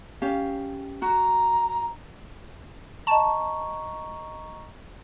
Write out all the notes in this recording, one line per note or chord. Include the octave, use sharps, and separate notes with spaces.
C#4 G4 F5
F#4 A#5
D#5 A5 A#5 C#6